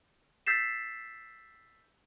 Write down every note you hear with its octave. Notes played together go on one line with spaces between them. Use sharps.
E6 G6 A6 B6 C7 E7